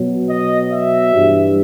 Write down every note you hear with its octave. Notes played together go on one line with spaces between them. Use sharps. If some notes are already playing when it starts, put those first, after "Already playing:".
Already playing: B2 F#3
D#5
E5
G2 E3 G3